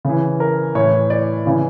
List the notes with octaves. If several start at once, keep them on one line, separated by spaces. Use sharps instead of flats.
C#3 E3
A#4
A2 E3 C#5
D5
C#3 E3